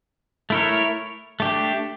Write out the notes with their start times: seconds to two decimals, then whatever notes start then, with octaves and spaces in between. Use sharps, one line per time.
0.50 A3 E4 A#4 C#5
1.40 A3 D4 G4